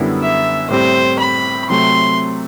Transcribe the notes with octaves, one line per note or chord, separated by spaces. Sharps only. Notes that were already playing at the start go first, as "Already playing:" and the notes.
Already playing: F#2 D3 G3 B3 E4
E5
A2 G3 C4 G4 C5
B5
C3 F#3 A3 C4 C6